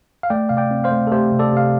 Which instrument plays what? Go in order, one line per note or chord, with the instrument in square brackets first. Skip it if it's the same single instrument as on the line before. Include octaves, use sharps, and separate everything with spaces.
[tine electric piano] F5
A3 D5 G5
C3 F5
D5 G5
C4
C5 F5
A3
A4
A3 G4 C5
C3
A4 D5
C3 F5